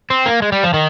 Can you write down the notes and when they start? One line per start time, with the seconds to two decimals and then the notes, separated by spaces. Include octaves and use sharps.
0.10 C4
0.26 A#3
0.42 G#3
0.52 G3
0.64 F3
0.74 D#3